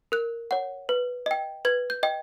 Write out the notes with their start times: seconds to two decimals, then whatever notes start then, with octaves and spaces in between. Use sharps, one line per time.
0.12 A#4 F#6
0.51 C#5 F#5
0.89 B4
1.26 D#5 G5
1.65 B4 G#6
1.90 G6
2.03 D#5 G5